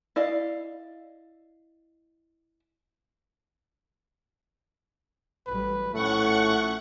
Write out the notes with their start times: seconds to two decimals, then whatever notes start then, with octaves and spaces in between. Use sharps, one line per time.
0.16 E4 D5 D#5 F5
5.47 A1 F#3 G3 B4
5.94 A#1 A2 F3 A3 C#4 F#5 C#6